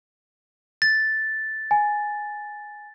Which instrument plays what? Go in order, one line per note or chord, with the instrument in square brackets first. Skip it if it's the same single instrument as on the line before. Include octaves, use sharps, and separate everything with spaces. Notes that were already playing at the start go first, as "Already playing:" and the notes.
[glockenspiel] A6
[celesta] G#5